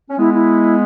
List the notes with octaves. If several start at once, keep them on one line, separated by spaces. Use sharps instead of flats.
C#4
G#3 B3 E4
E4